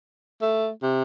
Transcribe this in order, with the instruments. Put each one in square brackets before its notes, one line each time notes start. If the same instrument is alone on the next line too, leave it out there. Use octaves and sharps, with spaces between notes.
[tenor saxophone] A3
C3